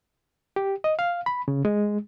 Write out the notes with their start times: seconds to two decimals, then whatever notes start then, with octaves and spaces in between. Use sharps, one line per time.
0.56 G4
0.84 D#5
0.99 F5
1.26 B5
1.48 C#3
1.65 G#3